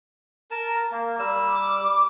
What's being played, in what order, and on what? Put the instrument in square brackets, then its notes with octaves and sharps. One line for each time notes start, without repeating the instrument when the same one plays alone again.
[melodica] A#4 A5
A#3
G3 E6
[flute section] D6